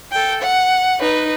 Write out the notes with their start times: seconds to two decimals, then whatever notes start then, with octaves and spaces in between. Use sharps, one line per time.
0.12 A4 G5
0.43 F#5
1.01 D#4 B4